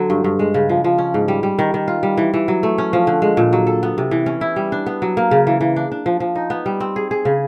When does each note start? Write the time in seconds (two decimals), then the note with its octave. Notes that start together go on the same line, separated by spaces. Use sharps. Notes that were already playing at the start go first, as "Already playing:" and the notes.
Already playing: D3 F#3
0.10 G2
0.24 G2
0.39 G#3
0.54 C#3
0.69 F3
0.84 F3
0.98 C#4
1.14 G#2
1.28 G3
1.43 G3
1.59 D#3
1.74 D#3
1.88 F4
2.03 G3
2.17 E3
2.34 E3
2.48 F#3
2.63 A3
2.78 C#4
2.93 F3
3.07 D3
3.22 G#3
3.37 A#2
3.53 F#3
3.67 A4
3.83 B3
3.98 C3
4.11 E3
4.26 C#4
4.41 E4
4.56 G3
4.72 D4
4.86 B3
5.02 F#3
5.17 A#3
5.31 C#3
5.47 E3
5.61 E3
5.76 D4
5.92 D4
6.06 F3
6.20 F3
6.35 D#4
6.50 B3
6.66 G3
6.80 C4
6.96 G#4
7.11 G#4
7.25 C#3